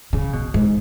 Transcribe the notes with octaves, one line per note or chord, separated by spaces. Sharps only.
C#3
B2
G#2